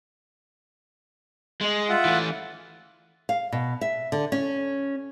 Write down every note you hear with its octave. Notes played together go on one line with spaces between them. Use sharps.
G#3 C6
F4 E5 F#5
E3 A3
F5
B2
E5
D3
C#4